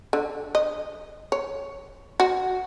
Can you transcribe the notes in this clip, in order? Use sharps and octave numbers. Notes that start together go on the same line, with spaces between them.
D3
D#5
C#5
F#4